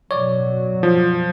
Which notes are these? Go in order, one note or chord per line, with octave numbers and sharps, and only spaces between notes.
F#2 B2 F#3 C#5 D5
F3